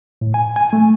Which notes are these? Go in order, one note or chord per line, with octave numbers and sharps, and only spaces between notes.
A2
G#5
G#5
A3